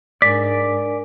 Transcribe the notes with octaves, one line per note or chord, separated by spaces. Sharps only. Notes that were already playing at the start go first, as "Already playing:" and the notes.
G#2 D4 A#4 D5 G#5 B6